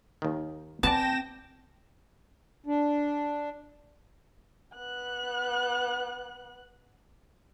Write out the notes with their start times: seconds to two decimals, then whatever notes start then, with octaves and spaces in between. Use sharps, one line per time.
0.22 D#2 D#3
0.83 B3 C4 D5 G5 A5 A#6 E7
2.66 D4
4.75 B3 F#6